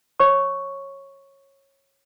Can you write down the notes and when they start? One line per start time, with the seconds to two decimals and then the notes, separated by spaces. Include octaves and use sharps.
0.20 C#5 C#6